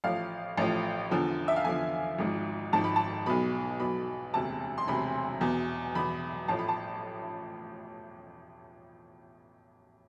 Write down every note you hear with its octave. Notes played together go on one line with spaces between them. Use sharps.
A1 A2 F3 F5
A1 A2 F3
E2 D3 F3
E5
F5
E2 D3 F3 G#5
G#1 G#2 F3
G#1 G#2 F3 A5
B5
A5
B1 B2 B5
B1 B2 B5
E1 D2 C3 A5
C6
E1 D2 C3 B5
E2 B2
E2 B2 B5
A1 A2 F3 A5
B5
A5